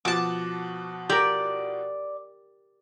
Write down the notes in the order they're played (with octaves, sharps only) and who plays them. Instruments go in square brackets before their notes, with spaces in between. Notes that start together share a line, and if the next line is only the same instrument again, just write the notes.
[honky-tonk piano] B2 F3 F#4 [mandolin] A5 D6
[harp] G4 A#4 [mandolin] D5